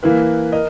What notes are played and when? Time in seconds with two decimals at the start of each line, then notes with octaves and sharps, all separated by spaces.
0.03 E3 A#3 E4 B4
0.52 A#4 D#5